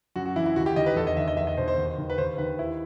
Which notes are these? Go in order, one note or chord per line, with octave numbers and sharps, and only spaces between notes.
F#2 F#4
F#4
E3 E4
E4
D#2 F#4
G4
D#3 D#5
B4
E2 A4
D#5
D#3 E5
D#5
E2 E5
D#5
B2 C5
C5
D#2
D#3
B4
D#2 C5
D#3 B4
D#2 E4